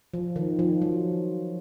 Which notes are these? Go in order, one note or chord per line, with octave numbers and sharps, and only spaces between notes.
F3
D#3
F3
F#3